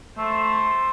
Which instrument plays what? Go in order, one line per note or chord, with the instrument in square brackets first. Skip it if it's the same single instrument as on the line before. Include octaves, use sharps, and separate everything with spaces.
[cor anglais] A3 [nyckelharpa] C5